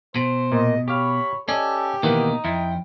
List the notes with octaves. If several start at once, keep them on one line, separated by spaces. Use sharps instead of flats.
B2 C5
A#2 D#5
G4 C#5 F5 B5
C#4 G4 A4 D5 D#5
B2 D#3 E3 A#3 D#4 F#5
F2 E4 G5